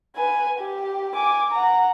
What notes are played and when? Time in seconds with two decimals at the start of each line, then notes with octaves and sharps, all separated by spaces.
0.16 B4 G#5
0.58 G4
1.14 G#5 D6
1.52 F#5 A#5